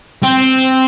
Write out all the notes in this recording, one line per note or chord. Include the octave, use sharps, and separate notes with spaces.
C4